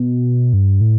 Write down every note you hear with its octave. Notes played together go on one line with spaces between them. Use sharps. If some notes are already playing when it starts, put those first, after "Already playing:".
Already playing: B2
G2
A2